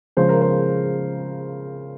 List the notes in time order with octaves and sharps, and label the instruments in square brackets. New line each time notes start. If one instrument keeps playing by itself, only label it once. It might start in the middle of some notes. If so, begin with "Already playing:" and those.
[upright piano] C#3 F3 G#3 C#4 C5
A#4
C5